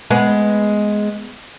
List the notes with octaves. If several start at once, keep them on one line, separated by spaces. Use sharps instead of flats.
G#3 B3